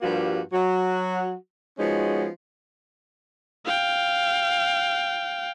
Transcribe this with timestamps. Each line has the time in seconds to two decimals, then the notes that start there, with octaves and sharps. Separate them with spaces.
0.02 G2 F3 G3 A#3 F4 F#4
0.52 F#3 F#4
1.79 F3 G#3 B3 C#4 D#4 F#4
3.65 F5 G5